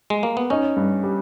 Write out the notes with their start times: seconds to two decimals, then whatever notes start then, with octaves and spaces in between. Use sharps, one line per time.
0.10 G#3
0.23 A#3
0.37 B3
0.50 C#4 D#4
0.76 G2
1.03 G3